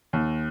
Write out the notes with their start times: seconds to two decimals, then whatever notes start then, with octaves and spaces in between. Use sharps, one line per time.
0.13 D#2